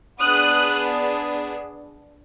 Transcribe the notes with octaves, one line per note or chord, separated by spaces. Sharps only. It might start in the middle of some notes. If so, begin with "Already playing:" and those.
B3 D4 G#4 D#6 F#6